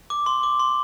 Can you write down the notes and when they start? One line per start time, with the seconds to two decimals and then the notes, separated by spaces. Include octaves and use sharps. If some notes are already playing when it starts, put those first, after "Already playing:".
0.10 D6
0.26 C6
0.43 D6
0.60 C6